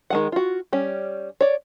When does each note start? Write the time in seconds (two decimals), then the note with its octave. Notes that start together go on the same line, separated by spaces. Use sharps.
0.10 D#3 G#3 F#5
0.32 F4 F#4
0.73 G3 C#4 G4
1.41 C#5 D5